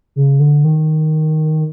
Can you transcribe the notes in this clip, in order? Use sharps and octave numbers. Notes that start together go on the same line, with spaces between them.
C#3
D3
D#3